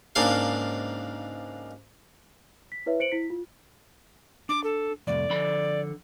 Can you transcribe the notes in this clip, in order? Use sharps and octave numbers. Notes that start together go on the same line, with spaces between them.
C#2 G#2 A#3 D4 F5 C6
B6
E4 B4 C#5 E5
C5 C#7 D7 F#7
E4 B6
F4
D4 D6
A4
C2 F2 A2 D5
D3 F3 B5